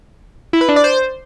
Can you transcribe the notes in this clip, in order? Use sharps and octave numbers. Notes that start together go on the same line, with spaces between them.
E4
B4
D4
D5
C5